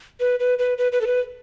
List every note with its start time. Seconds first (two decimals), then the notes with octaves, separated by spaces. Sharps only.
0.20 B4
0.40 B4
0.59 B4
0.78 B4
0.92 B4
1.01 A4
1.07 B4